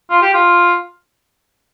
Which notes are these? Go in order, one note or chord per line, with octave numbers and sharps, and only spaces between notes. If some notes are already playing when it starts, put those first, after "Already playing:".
F4
G4
F4